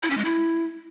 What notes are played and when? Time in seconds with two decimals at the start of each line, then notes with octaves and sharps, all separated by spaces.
0.03 E4
0.10 C#4
0.17 G#3
0.25 E4